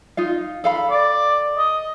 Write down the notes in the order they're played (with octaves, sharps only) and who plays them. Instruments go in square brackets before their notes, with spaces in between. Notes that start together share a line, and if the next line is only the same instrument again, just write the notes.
[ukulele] D#4 F4 F5
A4 F5 B5
[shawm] D5
D#5